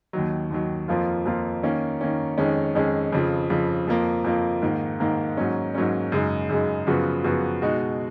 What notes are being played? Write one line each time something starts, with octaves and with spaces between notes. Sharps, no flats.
D#2 D#3 F#3
D#2 D#3 F#3
F2 F3 A#3 F4
F2 F3 A#3 F4
D#3 A#3 C#4
D#3 A#3 C#4
F2 D#3 G#3 C#4
F2 D#3 G#3 C#4
F2 C#3 F3
F2 C#3 F3
F2 F3 A#3
F2 F3 A#3
G#2 D#3 A#3
G#2 D#3 A#3
G#2 F#3 A#3 C#4
G#2 F#3 A#3 C#4
F#2 C#3 G#3 D#4
F#2 C#3 G#3 D#4
F#2 C#3 F3 B3 F#4
F#2 C#3 F3 B3 F#4
B2 G#3 D#4 F#4